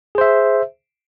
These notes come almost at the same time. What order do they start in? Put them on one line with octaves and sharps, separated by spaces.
G#4 C5 E5